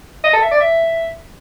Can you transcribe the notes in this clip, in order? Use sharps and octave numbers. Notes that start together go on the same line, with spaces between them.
D#5
A4
E5
D5
E5